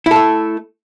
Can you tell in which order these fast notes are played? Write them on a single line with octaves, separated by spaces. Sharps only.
E4 A4 A3